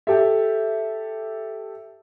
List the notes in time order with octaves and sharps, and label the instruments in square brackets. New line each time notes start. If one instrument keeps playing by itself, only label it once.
[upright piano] G4 A4 E5